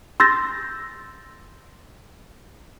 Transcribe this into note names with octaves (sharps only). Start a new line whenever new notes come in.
C6 E6 G6 A6 A#6